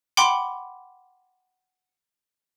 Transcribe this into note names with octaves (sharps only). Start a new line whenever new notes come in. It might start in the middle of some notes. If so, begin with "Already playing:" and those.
F#5 G5 B5 C6 D6